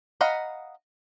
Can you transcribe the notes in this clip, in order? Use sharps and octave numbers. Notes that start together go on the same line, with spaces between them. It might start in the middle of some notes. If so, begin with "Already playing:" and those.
D#5 F5 F#5 A#5 B5